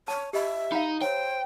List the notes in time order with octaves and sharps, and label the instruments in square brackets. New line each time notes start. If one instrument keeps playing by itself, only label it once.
[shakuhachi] C#5 [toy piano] A5
[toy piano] G4 D#5 B5 [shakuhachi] E5
[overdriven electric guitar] D#4 [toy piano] F5 A#5 B5
[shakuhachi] C5 [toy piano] C#5 [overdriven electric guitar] G5